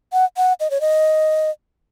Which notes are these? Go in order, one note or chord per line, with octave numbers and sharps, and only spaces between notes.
F#5
F#5
D#5
C#5
D#5